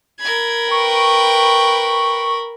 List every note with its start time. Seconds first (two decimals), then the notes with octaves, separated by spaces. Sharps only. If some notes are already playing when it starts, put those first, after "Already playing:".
0.20 A#4 B5 G#6
0.71 B4 G5 C#6